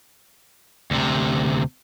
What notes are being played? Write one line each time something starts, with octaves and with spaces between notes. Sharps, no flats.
D2 C3